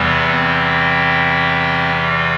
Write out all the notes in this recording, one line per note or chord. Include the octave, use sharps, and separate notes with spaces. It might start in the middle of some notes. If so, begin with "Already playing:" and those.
Already playing: E2 C3 E3 G3 B3
C4